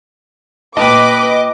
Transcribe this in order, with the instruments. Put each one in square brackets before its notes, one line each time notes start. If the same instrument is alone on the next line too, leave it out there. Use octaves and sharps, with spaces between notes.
[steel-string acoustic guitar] A#2 G5 A5 [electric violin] B4 [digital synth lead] D#5 [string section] D6